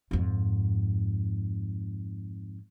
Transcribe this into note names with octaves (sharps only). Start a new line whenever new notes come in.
F2 G#2